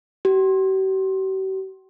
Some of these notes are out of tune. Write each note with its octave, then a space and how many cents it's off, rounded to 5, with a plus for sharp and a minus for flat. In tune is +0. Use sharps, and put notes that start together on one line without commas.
G4 -45